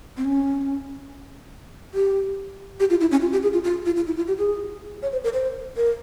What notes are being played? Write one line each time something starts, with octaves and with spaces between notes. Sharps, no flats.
C4
C#4
G4
G4
F4
E4
C#4
F4
G4
G#4
F4
F4
F4
F4
E4
F4
G4
G#4
C#5
C5
A#4
C5
A#4